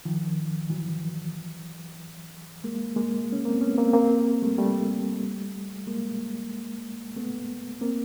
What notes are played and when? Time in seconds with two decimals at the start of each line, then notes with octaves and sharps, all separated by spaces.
0.05 D#3 F3
0.70 E3 F#3
2.64 G#3 A#3
2.96 G#3 A#3
3.32 C#4
3.45 A#3 C4
3.61 B3 C#4
3.78 A#3 C4
3.93 A#3 C4
4.42 G3 A3
4.58 G3 A3
5.87 G#3 A#3
7.16 A3 B3
7.81 A#3 C4